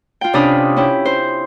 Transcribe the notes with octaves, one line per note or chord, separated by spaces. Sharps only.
F4 G5
C3 C#4 D4 B5 D#6 F6
C#4 E4 G5
C5